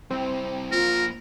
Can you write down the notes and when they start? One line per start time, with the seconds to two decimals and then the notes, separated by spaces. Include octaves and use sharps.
0.11 G3 C4 E4
0.72 A#3 F4 A#4 C5